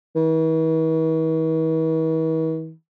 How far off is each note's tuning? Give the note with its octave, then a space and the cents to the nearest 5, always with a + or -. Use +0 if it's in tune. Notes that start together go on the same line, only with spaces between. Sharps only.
E3 -45